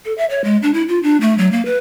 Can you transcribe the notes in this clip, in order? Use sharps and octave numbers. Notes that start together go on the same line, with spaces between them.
A4
E5
C#5
G#3
D4
E4
F4
D4
A3
F#3
A#3
B4